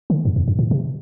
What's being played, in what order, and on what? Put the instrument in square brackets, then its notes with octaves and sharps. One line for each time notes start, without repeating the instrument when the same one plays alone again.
[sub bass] D3
F#2
E2
F#2
A2
C3